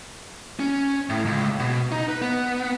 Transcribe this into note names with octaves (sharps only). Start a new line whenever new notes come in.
C#4
A2
C#2
B2
D#4
B4
B3